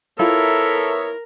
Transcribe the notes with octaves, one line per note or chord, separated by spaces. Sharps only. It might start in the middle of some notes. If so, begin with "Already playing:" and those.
B3 E4 F4 A4 A#4 C#5 E5 A#5